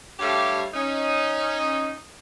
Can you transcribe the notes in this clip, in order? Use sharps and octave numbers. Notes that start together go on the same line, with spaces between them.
G2 G3 A3 G4 C#5 F5
C#4 D#4